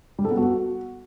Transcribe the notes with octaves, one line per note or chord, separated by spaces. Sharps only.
G3
A4
B3
F#4